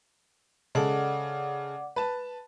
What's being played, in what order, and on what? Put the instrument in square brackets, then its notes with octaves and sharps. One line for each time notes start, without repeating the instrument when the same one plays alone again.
[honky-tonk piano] C#3 G#3 A4 [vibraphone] D5 F#5 D6
[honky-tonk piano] B4 A5